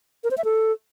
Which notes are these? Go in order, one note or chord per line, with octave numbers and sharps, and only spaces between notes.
A#4
C5
E5
A4